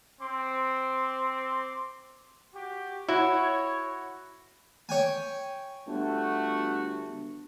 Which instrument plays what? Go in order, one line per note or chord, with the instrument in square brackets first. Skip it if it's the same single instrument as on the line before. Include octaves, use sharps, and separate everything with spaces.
[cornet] C4 [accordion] C6 D6
[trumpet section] F#4 G4
[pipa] E4 [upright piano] F#4 [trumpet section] C#5
[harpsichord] C#5 G5 G#5
[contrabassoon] G1 [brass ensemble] A3 F#4